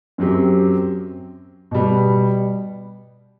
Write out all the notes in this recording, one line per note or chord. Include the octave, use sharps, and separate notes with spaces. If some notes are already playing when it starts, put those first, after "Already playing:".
F#2 F#3 C4 G4
B2 G3 B3